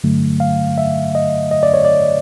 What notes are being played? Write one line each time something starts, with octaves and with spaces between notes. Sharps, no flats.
G2 D3 F#3 A3
F5
E5
D#5
D#5
D5
C#5
D5